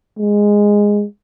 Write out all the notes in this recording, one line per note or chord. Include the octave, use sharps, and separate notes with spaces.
G#3